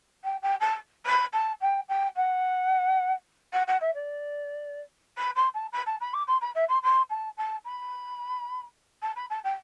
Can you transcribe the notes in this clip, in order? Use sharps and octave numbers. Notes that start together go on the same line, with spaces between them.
G5
G5
A5
B5
A5
G5
G5
F#5
F#5
F#5
E5
D5
B5
C6
A5
B5
A5
B5
D6
C6
B5
E5
C6
C6
A5
A5
B5
A5
B5
A5
G5